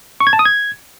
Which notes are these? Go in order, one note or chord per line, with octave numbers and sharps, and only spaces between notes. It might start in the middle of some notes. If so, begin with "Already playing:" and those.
C#6
G#6
A5
D#6
G#6